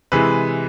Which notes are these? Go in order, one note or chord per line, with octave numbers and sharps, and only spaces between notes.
C3 E3 G#3 B4